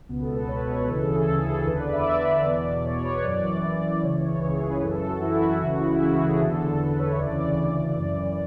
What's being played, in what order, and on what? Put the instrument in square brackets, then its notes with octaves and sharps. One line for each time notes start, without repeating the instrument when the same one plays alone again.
[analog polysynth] C#2 B2 B3
A4
B4
C#2 B2 C#5
B4
D2 C#3 E3 A4
G#4
A4
D2 C#3 E3 A4
G#4
A4
E2 D3 B4
D5
E5
E2 D3 D5
E2 B2
E2 B2 C#5
B4
C#5
F#2 E3 D5
F#2 E3 D5
C#2 C#3 E3 C#5
C#5
C#2 C#3 E3 G#4
B4
F#2 E3 A4
F#4
F#2 E3 E4
F#4
C#2 C#3 E3 F#4
E4
C#2 C#3 E3 F#4
G#4
A4
E2 D3 A4
A4
E2 D3 B4
C#5
E5
D2 C#3 E3 D5
D2 C#3 E3
F#2 E3